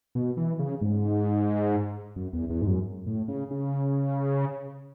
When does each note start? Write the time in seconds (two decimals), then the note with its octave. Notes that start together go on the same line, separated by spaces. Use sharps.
0.15 B2
0.37 E3
0.59 C#3
0.81 G#2
2.16 F#2
2.33 E2
2.50 E2
2.62 G#2
2.67 F#2
3.06 A2
3.28 C#3
3.51 C#3